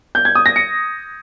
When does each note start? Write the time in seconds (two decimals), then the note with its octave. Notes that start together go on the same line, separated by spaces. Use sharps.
0.15 G6
0.25 G#6
0.35 D#6
0.46 A#6
0.56 C#7